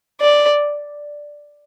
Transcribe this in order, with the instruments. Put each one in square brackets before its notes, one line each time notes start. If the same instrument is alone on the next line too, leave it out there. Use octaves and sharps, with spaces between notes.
[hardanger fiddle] D5